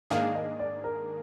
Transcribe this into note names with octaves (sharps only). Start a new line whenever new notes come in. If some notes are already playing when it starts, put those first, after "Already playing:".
G#2 D#3 A#3 D4 G#4 F5
D#5
D5
A#4